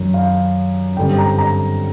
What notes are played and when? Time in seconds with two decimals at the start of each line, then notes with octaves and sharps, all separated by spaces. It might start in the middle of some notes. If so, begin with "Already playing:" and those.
Already playing: F#2 D#3 F#3
0.14 F5
0.97 G2 D3 G3 C4 G5
1.18 A#5
1.38 A#5